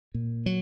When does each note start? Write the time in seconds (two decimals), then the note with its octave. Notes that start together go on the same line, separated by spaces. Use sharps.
0.14 A#2
0.46 F#3